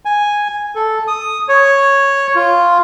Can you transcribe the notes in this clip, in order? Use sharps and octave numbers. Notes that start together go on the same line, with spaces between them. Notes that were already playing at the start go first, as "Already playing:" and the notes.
G#5
A4
D#6
C#5
F4